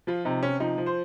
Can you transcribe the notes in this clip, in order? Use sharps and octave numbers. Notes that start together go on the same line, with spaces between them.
F3 F4
C3 D#4
C3 C#4
F3 D#4
F3
C5